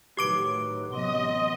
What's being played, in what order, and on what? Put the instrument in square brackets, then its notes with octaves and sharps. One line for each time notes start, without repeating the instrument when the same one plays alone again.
[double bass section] A2 D#3 F#3 [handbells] G4 D6 D7 [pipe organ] B4
[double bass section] A1 C3 F#3 [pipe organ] E3 B3 C6 [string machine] D#5